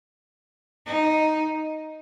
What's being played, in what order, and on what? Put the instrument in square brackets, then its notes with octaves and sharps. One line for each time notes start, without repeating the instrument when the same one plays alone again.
[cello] D#4